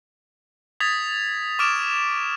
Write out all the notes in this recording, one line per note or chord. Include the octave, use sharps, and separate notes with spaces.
D#6 G#6 A6 B6 F7
C#6 D6 F6 D7 E7